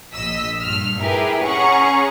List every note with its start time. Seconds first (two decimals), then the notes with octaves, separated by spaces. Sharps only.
0.13 A#1 D#5 E6 B6
0.62 G2 F6
1.01 E4 G4 G#4 A#4 B4
1.42 C#4 G#4 F#5 A#5 C#6